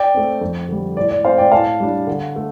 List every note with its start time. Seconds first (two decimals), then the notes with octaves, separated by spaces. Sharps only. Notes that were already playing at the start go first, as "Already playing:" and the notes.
Already playing: D5 G5
0.14 A3 C4
0.41 F2
0.69 D3 G3
0.97 A2 D5
1.10 D5
1.25 A3 C4 C5 F5
1.38 D5 G5
1.52 A2 F5 A5
1.80 G3 D4
2.07 D3
2.36 A3